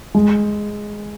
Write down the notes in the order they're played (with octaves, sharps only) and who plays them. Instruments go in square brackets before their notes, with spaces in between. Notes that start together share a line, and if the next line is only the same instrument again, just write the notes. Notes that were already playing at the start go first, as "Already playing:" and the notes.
[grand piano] G#3